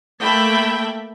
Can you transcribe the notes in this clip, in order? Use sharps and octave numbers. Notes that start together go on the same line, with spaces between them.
A3 A#3 E5 G5 A5 B5